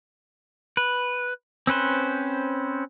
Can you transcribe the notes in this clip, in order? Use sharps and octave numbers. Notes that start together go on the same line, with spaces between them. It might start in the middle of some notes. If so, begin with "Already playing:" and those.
B4
C4 C#4 B4 C5